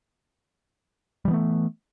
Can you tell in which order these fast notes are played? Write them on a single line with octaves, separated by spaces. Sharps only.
G3 E3 B3 A3